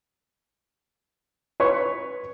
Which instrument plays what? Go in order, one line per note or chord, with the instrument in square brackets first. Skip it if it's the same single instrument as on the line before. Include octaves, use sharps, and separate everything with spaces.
[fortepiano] B4 C#5 C#6